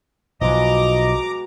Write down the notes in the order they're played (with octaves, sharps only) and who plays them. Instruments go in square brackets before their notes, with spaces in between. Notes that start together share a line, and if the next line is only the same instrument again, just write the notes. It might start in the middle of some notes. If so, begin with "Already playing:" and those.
[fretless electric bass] B1 F3 [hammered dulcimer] B2 G#3 [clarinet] D#5 [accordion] A#5 D6